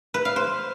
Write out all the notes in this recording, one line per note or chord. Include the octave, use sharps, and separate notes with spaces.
B4
F5
C5